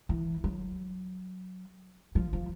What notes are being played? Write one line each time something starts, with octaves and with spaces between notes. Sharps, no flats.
E3
F#3
F3
F3